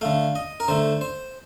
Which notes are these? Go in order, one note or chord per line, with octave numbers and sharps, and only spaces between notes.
D3 A3 F5
D#5
A#4
D3 A3 C5
C5